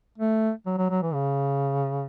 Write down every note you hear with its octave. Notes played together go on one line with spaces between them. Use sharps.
A3
F#3
F#3
F#3
E3
C#3